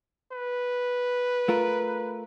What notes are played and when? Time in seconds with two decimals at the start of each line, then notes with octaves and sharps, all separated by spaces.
0.33 B4
1.48 A3 F4 A#4